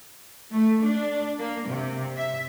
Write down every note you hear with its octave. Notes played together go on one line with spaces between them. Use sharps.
A3
D4
A#3
C3
E5